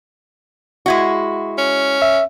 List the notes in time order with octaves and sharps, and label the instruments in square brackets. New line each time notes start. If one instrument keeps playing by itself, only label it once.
[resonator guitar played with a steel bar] G#3 E4 F#4
[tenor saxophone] C#4
[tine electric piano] E5